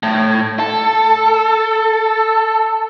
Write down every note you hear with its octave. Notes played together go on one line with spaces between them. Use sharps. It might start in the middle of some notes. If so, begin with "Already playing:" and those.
A2
A4